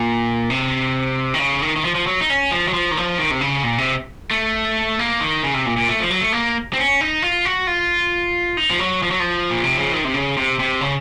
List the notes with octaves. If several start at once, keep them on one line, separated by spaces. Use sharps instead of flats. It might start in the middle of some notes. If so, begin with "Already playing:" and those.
Already playing: A#2
C3
D#3
C#3
D#3
D#3
F3
F3
F#3
D#4
C#4
F3
F#3
F3
D#3
F3
D#3
C3
C#3
A#2
C3
A3
A#3
D#3
C#3
C3
A#2
A#2
A3
F3
F#3
A3
A#3
C4
C#4
D#4
F4
F#4
F4
D#4
F3
F#3
F3
F#3
F3
A#2
C3
C#3
D#3
C3
C#3
C3
C3
C#3